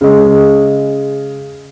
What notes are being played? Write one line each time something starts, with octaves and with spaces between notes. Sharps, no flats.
C#3 G#3